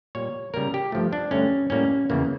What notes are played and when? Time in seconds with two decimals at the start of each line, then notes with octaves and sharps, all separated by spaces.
0.15 A#2 G3 A#3 C#5
0.54 C#3 G3 A#3 A#4
0.74 G4
0.92 G2 F3 A3
1.13 D4
1.31 G2 D3 A3 C#4
1.70 A2 G3 A#3 C#4
2.09 E2 C#3 E3 A#3